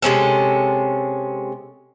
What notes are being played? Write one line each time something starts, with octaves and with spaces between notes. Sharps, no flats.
C3 G#3 C#4 A4